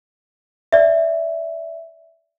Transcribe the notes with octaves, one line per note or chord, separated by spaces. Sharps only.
D5 E5